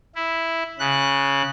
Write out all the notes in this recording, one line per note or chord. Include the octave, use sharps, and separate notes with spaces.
E4
C#3 F#6